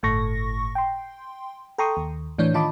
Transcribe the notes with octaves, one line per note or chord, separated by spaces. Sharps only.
G1 A2 A4 C#6 A#6
G5 C6
A4 G5 A#5 C6 C#6 D#6
D#2
A2 E3 D4 C#5 G6
D#3 F4 D#5 A5 B5 D6